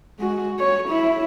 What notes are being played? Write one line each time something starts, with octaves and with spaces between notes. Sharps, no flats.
G#3 F#4
C#5
E4